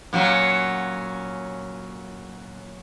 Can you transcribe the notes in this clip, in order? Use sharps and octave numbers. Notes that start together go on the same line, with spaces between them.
A#2 F#3 C#4